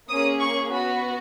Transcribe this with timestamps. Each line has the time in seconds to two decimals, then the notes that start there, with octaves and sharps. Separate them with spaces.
0.08 A#3 C#4 G#4 D#6
0.40 C#6
0.72 B3 F#4 B5